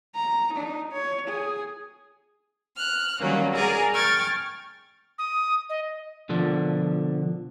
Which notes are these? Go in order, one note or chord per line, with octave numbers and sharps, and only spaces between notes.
A#5
D#4
C#5
G#4
F6 F#6
D#3 F#3 G3 A#3 C#4
G#4 A#4 D5 G#5 A#5
G5 C#6 F6 G#6 A6
D#6
D#5
B2 D3 F3 D4